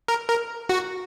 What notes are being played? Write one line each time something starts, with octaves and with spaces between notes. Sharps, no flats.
A#4
A#4
F#4